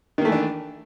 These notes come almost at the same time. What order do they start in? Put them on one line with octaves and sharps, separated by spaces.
D#3 A#3 A3 E3 D4